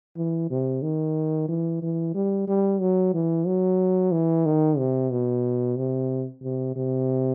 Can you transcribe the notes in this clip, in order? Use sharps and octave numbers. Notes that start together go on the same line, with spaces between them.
E3
C3
D#3
E3
E3
G3
G3
F#3
E3
F#3
E3
D#3
C3
B2
C3
C3
C3